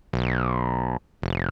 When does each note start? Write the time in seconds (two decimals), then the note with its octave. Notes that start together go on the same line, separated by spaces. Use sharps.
0.13 B1
1.22 F1